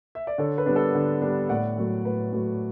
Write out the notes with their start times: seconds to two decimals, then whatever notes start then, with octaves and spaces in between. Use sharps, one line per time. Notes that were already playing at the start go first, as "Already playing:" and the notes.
0.15 E5
0.27 D5
0.38 D3 A4 C#5
0.58 B4
0.66 G3 B3 D4
0.76 A4
0.95 D3
1.22 G3 B3 D4
1.49 A2 D5 F#5
1.78 F#3 A3
2.05 A2 B4
2.33 F#3 A3